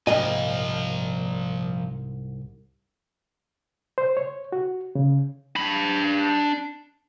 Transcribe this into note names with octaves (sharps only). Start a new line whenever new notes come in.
C2 G#2 F3 A#3 D#5 G#5
C5
C#5
F#4
C#3
D4 B5